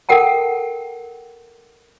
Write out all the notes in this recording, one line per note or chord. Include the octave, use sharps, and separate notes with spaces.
A4 A#4 F#5 G5 A5